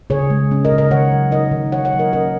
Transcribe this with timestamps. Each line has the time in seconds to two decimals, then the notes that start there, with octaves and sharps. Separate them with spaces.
0.10 C#3 G#4 C#5
0.30 G#3
0.51 C#4
0.65 A#4 D#5
0.72 C#3
0.78 A#4 D#5
0.91 D#3 C#5 F#5
1.12 F#3
1.31 D#4 A#4 D#5
1.51 D#3
1.72 D#3 C#5 F#5
1.85 C#5 F#5
1.93 F#3
1.99 A#4 D#5
2.13 C#4 A#4 D#5